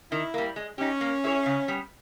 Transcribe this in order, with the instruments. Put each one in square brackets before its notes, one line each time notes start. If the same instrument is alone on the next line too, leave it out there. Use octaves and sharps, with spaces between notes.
[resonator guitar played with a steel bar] D#3 [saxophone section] E4
[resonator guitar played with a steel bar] G3 A#3
G#3
[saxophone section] C#4 [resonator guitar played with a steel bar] D#4 G4
[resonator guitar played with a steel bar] A#3
E4 G#4 C#5
C#3
G3 B3